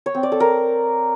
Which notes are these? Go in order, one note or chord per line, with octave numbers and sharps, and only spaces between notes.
C#5
C4
D5
A4
A#4